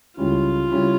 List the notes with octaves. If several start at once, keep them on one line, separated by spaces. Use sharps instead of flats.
C#2 C#3 G3 C#4 E4 F4
C#3 G3 C#4 E4